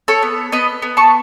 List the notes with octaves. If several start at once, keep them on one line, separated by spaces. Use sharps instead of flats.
A4 C#5
B3
B3 B4 D#5
B3
A5 C#6